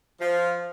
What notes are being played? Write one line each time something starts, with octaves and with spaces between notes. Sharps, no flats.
F3